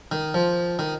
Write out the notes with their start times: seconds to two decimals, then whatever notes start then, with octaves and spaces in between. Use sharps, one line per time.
0.12 D#3
0.34 F3
0.79 D#3